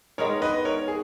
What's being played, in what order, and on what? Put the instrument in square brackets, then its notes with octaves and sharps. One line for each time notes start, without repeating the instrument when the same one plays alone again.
[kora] D#3 G#3 B3 D#4 [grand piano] A#4 C#5
[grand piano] B4 D#5
A#4 C#5
G#4